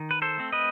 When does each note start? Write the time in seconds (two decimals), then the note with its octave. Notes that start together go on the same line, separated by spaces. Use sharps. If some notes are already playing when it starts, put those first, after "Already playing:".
Already playing: D#3
0.11 B4
0.22 A4 C5
0.38 A3 C4
0.52 B4 D#5